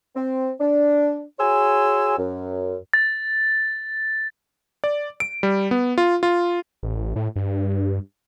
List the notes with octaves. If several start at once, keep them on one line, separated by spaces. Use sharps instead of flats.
C4
D4
F#4 G#4 C#5 G#5 C6 E6
F#2
A6
D5
D7
G3
B3
F4
F4
A1
A2
G2